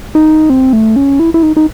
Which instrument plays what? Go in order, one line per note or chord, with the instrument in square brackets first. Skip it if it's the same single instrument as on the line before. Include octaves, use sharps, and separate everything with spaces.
[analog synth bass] D#4
C4
A3
C#4
E4
E4
D#4
D#4